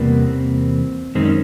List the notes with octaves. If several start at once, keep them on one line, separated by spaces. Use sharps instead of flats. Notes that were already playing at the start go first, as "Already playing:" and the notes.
Already playing: E2 C3 E3 G3 A#3 B3
C4
F#2 D#3 G#3 C4
C#4